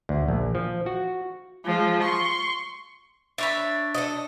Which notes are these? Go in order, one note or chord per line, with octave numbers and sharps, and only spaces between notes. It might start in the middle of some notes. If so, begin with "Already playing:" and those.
D2
A#1
F3
F#4
F3 G#3
C6 C#6
D4 C#5 E5 B5
A4 C5 D#5